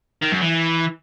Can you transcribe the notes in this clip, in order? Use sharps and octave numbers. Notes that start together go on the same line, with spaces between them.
D#3
F#2
E3